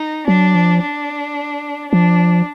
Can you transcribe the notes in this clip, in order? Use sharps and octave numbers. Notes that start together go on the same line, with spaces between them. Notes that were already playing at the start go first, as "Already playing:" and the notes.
Already playing: D#4
F#3 D4
F3
D4
F3 D4